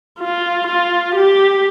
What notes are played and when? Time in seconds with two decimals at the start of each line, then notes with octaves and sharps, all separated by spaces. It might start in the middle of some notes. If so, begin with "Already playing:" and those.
0.20 F4
0.67 F4
1.15 G4